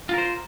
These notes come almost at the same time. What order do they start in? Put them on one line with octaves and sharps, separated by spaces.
F4 A#4 C5